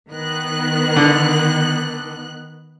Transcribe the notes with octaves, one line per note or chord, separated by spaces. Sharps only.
D#3 B3 F#6
D3